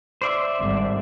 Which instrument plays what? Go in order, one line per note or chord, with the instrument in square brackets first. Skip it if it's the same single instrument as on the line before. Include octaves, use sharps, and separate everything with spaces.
[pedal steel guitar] C5 D5 E5
[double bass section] G#1 D3 G3